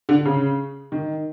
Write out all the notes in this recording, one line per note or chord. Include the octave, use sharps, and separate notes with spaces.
D3
C#3
D#3